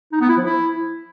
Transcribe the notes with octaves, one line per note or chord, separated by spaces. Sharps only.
D#4
B3
E4
F3
E4